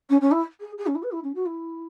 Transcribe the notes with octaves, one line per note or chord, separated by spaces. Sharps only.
C#4
C#4
E4
G#4
G#4
C#4
E4
B4
E4
C#4
F#4
E4